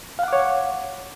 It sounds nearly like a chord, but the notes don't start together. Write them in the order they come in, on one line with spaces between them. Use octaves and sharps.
F5 F#5 D6 C#5